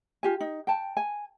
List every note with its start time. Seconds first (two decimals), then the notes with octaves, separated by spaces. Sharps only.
0.23 F4 G4 G#5
0.41 D#4
0.67 G5 A5
0.97 G#5